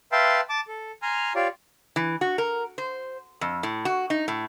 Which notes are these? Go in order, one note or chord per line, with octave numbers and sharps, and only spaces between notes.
B4 E5 F5 G5 A5 C6
A5 D6
A4
G#5 A#5 C6 F6
F4 G4 C#5 D5 F5
E3
F#4
A#4
C5
F2
A2
F#4
D#4
A2